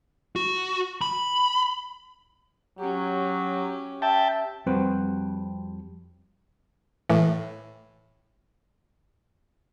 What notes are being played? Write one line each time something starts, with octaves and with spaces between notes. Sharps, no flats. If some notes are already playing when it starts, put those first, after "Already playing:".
F#4
B5
F#3 C#4 G4
E5 G5 A5
F2 G3 C4 F#4 B4 C5
A2 E3